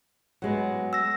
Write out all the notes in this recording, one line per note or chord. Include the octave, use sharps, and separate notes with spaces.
F#3 G#3 B3
E6 A#6